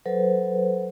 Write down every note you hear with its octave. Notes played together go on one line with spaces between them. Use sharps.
F#3 A4 B4 C5